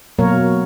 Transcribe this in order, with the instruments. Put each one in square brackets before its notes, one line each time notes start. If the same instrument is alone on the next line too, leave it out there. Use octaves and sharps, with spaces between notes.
[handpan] B2 F#3 A#3 A#4 C#5